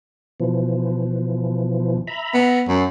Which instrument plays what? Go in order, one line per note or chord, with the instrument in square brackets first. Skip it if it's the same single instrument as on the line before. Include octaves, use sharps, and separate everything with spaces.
[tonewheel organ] B2 E3 F3
E5 A#5 B5
[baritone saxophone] B3
F#2